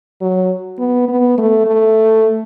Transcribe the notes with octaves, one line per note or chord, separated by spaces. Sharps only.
F#3
B3
B3
A3
A3